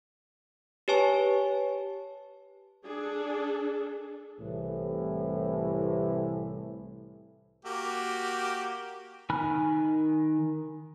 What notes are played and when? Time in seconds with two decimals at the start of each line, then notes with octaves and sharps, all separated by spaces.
0.88 G4 B4 C#5 G#5 A5 C#6
2.85 D4 G#4 A4
4.40 C2 A2 C3 E3
7.65 A#3 F#4 G4
9.30 D#3 G#5 B5 F6 F#6